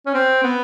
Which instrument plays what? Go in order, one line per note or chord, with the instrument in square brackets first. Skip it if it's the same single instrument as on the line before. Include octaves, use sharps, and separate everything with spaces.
[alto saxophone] C#4
C4
B3